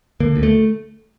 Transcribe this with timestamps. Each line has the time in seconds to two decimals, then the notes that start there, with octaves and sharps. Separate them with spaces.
0.20 D3 A#3
0.36 D2
0.43 A3